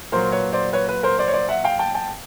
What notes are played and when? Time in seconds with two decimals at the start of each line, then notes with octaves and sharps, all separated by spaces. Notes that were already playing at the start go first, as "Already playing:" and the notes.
0.12 A#2 F#3 A#4 C5
0.32 B4 C#5
0.53 C5 D5
0.73 B4 C#5
0.89 B4
1.03 A#4 C5
1.19 C5 D5
1.28 C#5
1.33 C5 D5
1.49 E5 F#5
1.64 F5 G5
1.79 G5 A5
1.95 G5 A5